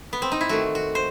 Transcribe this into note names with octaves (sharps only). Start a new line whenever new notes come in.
B3
C4
D#4
E4
D#3 A3 F#4
F#4
C5